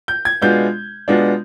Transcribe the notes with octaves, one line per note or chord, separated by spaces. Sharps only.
G6
G#6
B2 G#3 B3 D4 F4 G6
B2 G#3 B3 D4 F4